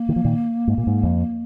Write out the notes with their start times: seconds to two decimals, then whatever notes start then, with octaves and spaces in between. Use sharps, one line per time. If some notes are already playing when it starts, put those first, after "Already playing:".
Already playing: A#3
0.09 D#3
0.16 F3
0.24 A#2 D#3
0.68 G#2
0.78 A#2
0.87 G#2
1.03 F2